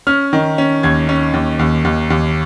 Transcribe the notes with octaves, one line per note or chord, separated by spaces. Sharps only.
C#4 F6
D#3
C#4
D#2 G#6
C#4
D#2
D#2
D#2
D#2